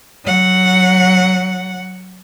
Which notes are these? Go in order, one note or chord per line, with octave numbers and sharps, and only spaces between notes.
F#3 F#5